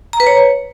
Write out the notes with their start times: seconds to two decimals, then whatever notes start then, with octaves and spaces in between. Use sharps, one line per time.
0.13 A#5
0.20 B4
0.27 C#5